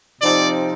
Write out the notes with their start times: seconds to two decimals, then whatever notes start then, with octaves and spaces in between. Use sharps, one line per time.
0.21 C3 F3 C4 D#4 D5